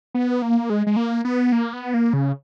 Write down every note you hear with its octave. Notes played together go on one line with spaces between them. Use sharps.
B3
A#3
G#3
G#3
A#3
B3
A#3
B3
A#3
C#3